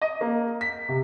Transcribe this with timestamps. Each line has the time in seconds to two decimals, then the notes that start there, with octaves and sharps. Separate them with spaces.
0.02 D#5
0.21 A#3
0.61 B6
0.89 C3